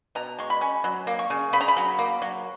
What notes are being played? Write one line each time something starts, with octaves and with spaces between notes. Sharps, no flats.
B2 A#5
G#3 C#6
B5
C#4
F#3
A#3
C#6
C#3
C#3 B5
A#5
B5
F#3
A#3
F#3